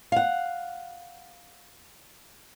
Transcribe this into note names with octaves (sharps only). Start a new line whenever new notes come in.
F5 F#5